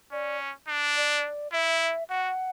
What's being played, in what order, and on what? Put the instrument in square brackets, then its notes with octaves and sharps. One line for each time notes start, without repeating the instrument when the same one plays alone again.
[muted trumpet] C#4 [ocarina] D5
[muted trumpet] D4
[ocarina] D5
[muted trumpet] E4 [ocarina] E5
[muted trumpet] F#4 [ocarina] F#5